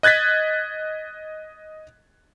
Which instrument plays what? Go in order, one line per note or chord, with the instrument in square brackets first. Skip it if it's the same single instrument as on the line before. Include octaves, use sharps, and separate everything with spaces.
[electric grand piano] D#5 F#6 G#6 A6 B6